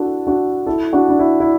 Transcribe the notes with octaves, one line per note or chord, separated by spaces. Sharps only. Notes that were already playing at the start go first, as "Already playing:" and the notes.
Already playing: D4 E4 F#4 A4
D4 F#4
E4 A4
D4 F#4
D4
E4
E4